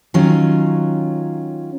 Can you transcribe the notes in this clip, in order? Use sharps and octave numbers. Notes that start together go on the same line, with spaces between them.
D#3 F#3 C#4 F4